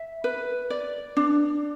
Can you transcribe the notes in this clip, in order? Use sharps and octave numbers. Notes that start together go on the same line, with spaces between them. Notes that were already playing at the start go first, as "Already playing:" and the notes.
Already playing: E5
B4
D5
D4